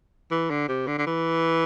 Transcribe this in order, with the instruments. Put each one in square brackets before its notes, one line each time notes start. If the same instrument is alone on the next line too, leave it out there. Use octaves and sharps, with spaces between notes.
[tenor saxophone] E3
D3
C3
D3
D3
E3